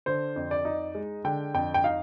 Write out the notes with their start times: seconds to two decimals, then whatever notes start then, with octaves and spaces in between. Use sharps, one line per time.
0.06 D3 C5
0.36 F2
0.51 D5
0.65 D#4
0.95 G#3
1.24 D3 G5
1.54 F2 G5
1.74 G5
1.84 D#4 F5